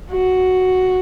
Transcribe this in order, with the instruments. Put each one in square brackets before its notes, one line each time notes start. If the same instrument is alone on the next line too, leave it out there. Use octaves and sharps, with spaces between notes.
[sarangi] F#4